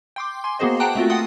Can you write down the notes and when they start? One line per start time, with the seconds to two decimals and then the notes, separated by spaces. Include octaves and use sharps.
0.16 G5 C6 D6
0.44 G#5 C6
0.59 A#3 B3 F#4 G#4 C5 D#5
0.80 F#5 G5 A5 A#5 F#6 D7
0.95 A3 C4 F4 F#4
1.10 F#5 G5 C6 D#6 F#6